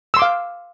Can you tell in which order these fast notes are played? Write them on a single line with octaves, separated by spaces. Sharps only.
E6 C6 D6 F5